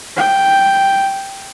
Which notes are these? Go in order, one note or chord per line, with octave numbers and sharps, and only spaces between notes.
G5